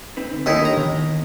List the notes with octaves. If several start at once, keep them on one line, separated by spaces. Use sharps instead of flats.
C4 D#4 B4
D3
D#2 D#4 E4
A#5
D#3 B3 D#5